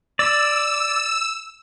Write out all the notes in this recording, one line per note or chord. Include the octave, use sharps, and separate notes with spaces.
D5 E6